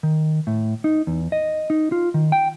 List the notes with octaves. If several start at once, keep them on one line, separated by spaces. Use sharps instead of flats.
D#3
A2
D#4
E2
D#5
D#4
F4
D#3
G5